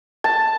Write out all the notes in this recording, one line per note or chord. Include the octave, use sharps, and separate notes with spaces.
A5